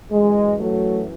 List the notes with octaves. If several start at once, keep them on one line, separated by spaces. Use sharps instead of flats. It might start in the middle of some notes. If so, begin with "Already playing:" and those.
F#2 E3 G#3
F#3 A3